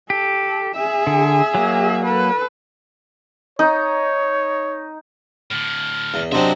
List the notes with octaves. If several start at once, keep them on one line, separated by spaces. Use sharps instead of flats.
G4 A4
G#4 E5
D3
F#3 A#3
A4 B4
D#4 C#5
A2 D3 F6
E2
C3 F#3 C4 D4 D#4 D#5 E5 C6